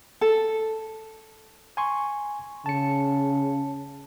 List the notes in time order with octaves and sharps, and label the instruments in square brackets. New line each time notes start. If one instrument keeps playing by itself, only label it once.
[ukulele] A4
[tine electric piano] G#5 C6 C#6
[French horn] C#3 [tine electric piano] A5 C#7